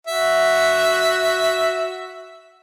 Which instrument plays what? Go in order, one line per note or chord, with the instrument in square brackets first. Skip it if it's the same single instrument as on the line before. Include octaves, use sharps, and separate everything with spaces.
[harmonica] F#4 E5